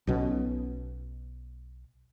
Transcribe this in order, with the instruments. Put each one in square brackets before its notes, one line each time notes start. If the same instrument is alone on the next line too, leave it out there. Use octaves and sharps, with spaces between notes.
[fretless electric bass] B1 B2 G3 C#4